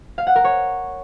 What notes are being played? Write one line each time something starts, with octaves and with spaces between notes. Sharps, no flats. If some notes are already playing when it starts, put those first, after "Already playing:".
F5
F#5
A#4
C#5